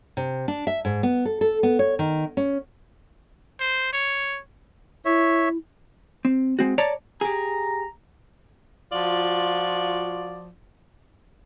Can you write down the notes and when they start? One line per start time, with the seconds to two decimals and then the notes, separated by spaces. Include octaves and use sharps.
0.17 C3
0.48 D4
0.67 E5
0.85 G#2
1.03 B3
1.25 A4
1.41 A4
1.63 B3
1.79 C#5
1.99 D#3
2.37 C#4
3.60 C5
3.93 C#5
5.05 E4 C#5 E5
6.25 C4
6.59 G#3 C4 F#4
6.78 C#5 D5 A5 A#5
7.21 G4 G#4 A#5
8.91 F3 F4 F#4 D5